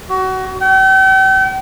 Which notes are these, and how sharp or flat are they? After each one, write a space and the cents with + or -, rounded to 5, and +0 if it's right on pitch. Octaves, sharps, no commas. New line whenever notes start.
F#4 +25
G5 -40